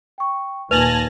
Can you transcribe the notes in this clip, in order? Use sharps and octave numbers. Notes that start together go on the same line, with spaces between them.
G5 C#6
D#2 A#2 B4 G#5 A5 A#6 F7 F#7